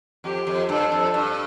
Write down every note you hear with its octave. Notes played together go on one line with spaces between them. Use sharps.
F2 G4
F2
G2 A4
F2
G2